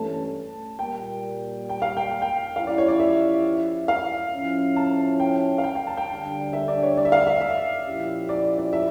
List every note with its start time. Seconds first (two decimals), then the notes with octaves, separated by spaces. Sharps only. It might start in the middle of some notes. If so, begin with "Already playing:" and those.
Already playing: G2 E3 A3 C#4 A5
0.79 A#2 G3 A#3 G5
1.69 G5
1.82 F5
1.97 G5
2.11 G5
2.22 G5
2.55 F3 C#4 E4 G4 F5
2.67 D5
2.78 C#5
2.88 D5
3.00 E5
3.88 F5
4.32 A2 F3 C#4 E4
4.76 A5
5.20 G5
5.58 F5
5.64 G5
5.75 G5
5.87 A5
5.97 G5
6.08 D2 D3 G3 D4
6.53 E5
6.68 D5
6.83 C#5
6.97 D5
7.05 E5
7.12 F5
7.27 E5
7.41 E5
7.85 A#2 F3 C#4 E4 G4
8.29 D5
8.58 D5
8.73 E5